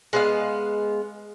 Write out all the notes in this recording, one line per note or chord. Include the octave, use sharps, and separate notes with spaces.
G#3 B3 F5